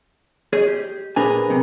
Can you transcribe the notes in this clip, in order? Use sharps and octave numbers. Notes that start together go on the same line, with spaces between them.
G#4 C#5 D#5
G4
A#2 D4 G#4 A#4 B4 G#5
B1 C3